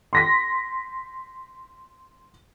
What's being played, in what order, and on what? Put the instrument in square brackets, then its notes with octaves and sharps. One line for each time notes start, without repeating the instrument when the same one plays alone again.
[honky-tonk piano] C6 A#6 B6